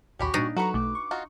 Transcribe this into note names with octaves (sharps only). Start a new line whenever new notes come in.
A#1 D#2 C#4 F#4 G4 B5
G2 A#2 D4 D#4
F#3 F#4 A4 B4 A#5 C#6
B1 A3 D6
C#6
D#4 F4 F#4